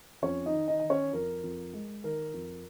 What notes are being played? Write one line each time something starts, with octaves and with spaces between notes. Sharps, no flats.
F2 C#4 C#5
D#4 D#5
D#3
D#4 D#5
D#3 D#5
C#4 C#5
F2 A#4
F2
G#3
D#3 A#4
F2